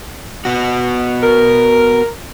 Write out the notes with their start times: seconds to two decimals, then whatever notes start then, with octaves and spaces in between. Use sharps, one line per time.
0.45 B3 F#4
1.21 A#4